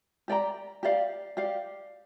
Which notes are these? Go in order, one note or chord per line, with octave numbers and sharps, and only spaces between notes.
G4 D5 G5 A#5
G4 D5 F5
G4 D5 F5